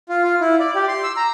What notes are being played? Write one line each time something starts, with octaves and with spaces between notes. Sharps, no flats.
F4
F4
E4
D5
G4
C6
E6
A#5